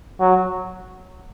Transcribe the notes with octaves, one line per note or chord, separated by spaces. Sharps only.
F#3